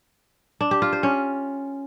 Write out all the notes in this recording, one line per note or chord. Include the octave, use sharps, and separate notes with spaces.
D4
G4
F4
C5
C#4